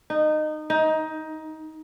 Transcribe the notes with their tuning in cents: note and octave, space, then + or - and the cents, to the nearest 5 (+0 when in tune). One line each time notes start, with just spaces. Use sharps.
D#4 -20
D#4 +15